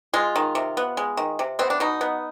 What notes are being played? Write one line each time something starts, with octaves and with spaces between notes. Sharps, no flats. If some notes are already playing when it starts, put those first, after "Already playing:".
G#3 F4
D#3
C3
B3
G#3
D#3
C3
B3 C4
D4
B2 D#4
B3